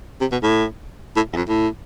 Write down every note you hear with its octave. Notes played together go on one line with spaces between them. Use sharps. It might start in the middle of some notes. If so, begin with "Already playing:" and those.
C3
B2
A2
A2
E2
F2
A2